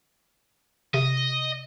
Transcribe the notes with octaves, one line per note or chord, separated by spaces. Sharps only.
C3 D#5